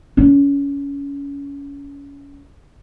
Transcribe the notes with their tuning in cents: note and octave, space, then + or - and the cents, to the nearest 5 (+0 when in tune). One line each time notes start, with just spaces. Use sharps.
C#4 +25